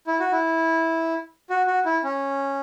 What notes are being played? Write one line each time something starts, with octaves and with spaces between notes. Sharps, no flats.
E4
F#4
E4
F#4
F#4
E4
C#4